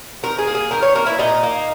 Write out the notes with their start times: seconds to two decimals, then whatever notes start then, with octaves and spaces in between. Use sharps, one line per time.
0.23 D#3 A#4
0.39 G#4
0.47 A#3
0.55 G#4
0.71 D#3 A#4
0.82 C#5
0.95 A#3 A#4
1.06 E4
1.19 A#2 D#4
1.43 A#3